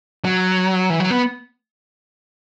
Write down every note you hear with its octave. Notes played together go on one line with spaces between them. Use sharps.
F#3
E3
F#3
B3